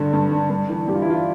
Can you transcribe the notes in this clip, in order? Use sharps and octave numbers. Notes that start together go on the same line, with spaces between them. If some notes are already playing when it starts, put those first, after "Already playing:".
Already playing: G2 D3
G2
D3
G2
E3
G2 G4
F4
E4
E3 F4